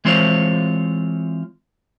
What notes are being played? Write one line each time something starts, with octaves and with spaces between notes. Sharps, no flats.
E3 G#3 C4 F4 C5 C#5